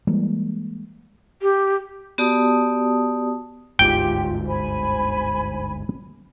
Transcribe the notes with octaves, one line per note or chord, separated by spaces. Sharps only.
E3 G3 G#3 A#3
G4
B3 F#4 G4 D5 A5 D#6
G1 D2 G#2 F4 G4 G5
C5 G#5 B5